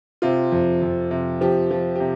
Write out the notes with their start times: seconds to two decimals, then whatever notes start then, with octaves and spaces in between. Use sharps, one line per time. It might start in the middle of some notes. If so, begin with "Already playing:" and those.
0.22 C3 F4
0.52 F2
0.82 F2
1.11 C3
1.41 F3 G4
1.71 F3
1.96 G4
2.00 C3